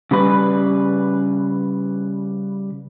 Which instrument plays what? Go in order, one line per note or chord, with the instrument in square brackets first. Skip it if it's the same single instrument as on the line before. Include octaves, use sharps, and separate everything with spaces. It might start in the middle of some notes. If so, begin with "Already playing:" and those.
[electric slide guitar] C#3 G3 B4